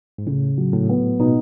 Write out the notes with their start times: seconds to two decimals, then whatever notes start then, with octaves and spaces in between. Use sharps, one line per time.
0.18 G#2
0.27 A2 C#3
0.58 F#3
0.73 A2
0.89 B3
1.20 B2 D#4